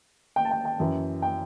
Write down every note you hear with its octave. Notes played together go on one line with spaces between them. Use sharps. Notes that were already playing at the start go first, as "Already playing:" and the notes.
G5
A5
G5
G5
F#2 E3
G5